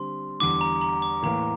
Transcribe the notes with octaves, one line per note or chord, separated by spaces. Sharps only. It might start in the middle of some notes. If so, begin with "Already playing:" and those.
Already playing: D3 G3 C4 C6
E2 D3 G3 D6
A#5
A#5
D6
A2 E3 A#3 A#5